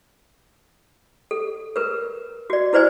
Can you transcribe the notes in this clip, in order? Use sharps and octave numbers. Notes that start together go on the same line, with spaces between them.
A4
A#4 B4
F#4 D5
E4 B4 C5 D5 G#5